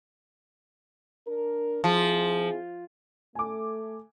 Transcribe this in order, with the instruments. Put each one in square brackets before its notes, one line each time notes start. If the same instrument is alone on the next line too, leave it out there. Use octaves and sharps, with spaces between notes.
[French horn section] D4 A#4
[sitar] F3 [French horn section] C4 E4 G#4
[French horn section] A3 [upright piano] G#5 D6